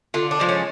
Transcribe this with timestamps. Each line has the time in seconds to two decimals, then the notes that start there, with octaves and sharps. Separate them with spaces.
0.14 D3 F4
0.31 D4
0.40 F3 G#3
0.49 C#4